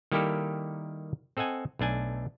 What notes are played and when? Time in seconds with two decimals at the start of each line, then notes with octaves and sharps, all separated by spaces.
0.12 D#3 G3 A#3 E4 G4 A4
1.37 C4 A4 D#5 F#5 G#5
1.79 B1 A3 D4 G#5